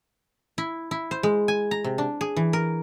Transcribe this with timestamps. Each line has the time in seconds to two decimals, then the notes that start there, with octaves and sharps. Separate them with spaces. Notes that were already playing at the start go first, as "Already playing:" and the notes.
0.58 E4
0.91 E4
1.11 C5
1.23 G#3
1.48 G#5
1.71 A#5
1.84 C3
1.98 D4
2.21 G#4
2.36 E3
2.53 A#4